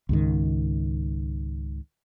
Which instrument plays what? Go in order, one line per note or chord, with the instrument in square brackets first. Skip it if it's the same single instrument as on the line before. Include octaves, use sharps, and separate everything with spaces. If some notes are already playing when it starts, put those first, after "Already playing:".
[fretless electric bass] C#2 G#2 D#3